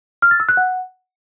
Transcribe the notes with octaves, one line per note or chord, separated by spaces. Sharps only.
F6
A6
E6
F#6
F#5